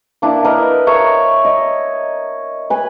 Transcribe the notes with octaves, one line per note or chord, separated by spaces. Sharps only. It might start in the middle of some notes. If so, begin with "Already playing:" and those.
A#3 D4 E4
A#4 B4 D#5
C#5 E5 A#5 B5
D#5
B4 G#5